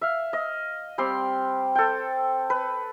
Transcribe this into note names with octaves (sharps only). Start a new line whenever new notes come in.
E5 F5
D#5
G3 C4 C6 D6
A4 G5
B4